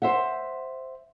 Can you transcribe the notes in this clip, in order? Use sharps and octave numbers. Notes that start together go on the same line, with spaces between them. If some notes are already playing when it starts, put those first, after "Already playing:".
C5 E5 F#5